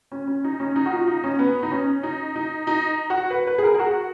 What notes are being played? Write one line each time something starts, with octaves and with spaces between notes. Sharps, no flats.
C#4
C#4
D#4
C#4
D#4
F#4
F4
D#4
C#4
B3
D#4
C#4
D#4
D#4
D#4
F#4
B4
B4
G#4
A#4
G#4
F#4